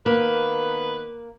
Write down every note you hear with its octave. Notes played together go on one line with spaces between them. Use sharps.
D#3 A#3 B3 B4